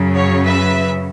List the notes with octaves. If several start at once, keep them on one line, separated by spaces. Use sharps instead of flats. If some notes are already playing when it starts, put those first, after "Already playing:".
Already playing: F#2 C#3 F#3
C#5
B4 E5